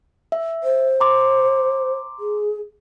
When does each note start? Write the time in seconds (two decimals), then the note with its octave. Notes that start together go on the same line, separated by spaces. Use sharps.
0.32 E5
0.64 C5
1.00 A#5 C6 D6
2.20 G#4